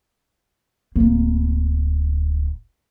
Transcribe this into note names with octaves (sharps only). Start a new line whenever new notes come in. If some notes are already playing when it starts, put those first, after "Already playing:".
D1 A#3